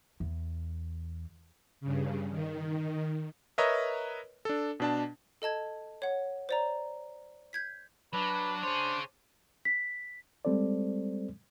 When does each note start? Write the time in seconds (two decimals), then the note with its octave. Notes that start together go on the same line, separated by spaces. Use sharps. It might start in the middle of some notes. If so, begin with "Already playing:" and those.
0.20 E2
1.80 G2 C#3
2.30 D#3
3.58 A#4 B4 C#5 D#5 E5 A#5
4.45 D4 A4
4.80 B2 D4 A5
5.42 A4 D#5 A5 G#6
6.02 C#5 F#5
6.49 C5 D5 A#5
7.53 G6 G#6 B6
8.13 F#3 D4 B4
8.63 G#4 C5 C#5
9.65 B6
10.45 G3 G#3 C4 A4 C5 D5